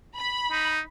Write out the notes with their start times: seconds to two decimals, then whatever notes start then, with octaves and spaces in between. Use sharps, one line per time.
0.16 B5
0.51 D#4